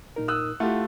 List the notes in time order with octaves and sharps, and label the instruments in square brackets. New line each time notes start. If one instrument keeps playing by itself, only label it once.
[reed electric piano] A#2 D#4 A#4
[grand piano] D#6 E6 F#6
[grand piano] A3 F4 G4 [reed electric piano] E4 F#5